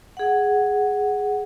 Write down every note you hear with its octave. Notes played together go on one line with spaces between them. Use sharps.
G#4 F#5